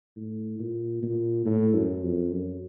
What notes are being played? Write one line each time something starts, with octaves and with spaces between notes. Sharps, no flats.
A2
A#2
A#2
A2
F#2
F2
F#2